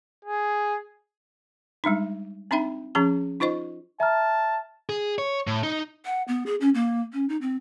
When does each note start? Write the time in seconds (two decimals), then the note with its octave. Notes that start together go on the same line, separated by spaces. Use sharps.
0.25 G#4
1.84 G3 G#3 D4 D#4
2.51 C4 D4 D#4 E5 G5 B5
2.95 F3 C#4 G#4 A#5
3.40 D#4 F4 C5 D#5 C#6
4.00 E5 A5 A#5 F6
4.89 G#4
5.18 C#5
5.47 A2
5.63 D#4
6.05 F#5
6.28 B3
6.46 G#4
6.61 C#4
6.75 A#3
7.13 C#4
7.29 D#4
7.41 C4